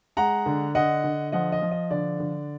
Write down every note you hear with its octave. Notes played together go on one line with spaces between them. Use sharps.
G#3 F#5 A#5
D3
D3 D#5 F#5
D3
F3 D#5 F#5
D#5
F3
D#5
D3 D5
D3